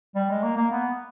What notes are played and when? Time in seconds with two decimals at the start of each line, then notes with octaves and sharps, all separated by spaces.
0.15 G3
0.30 G#3
0.43 A#3
0.57 A#3
0.72 B3